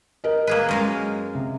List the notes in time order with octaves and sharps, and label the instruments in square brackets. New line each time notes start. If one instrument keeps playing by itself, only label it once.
[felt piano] A#4 D#5
[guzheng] A#3 G#4 B4
F#2 G#3 F5
[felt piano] C3